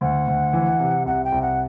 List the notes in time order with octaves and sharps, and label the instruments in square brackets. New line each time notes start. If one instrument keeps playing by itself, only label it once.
[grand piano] D2 [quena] F#5
[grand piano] D2
E3
C3
[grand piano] C2 [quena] F#5
[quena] G5
[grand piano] C2
[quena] F#5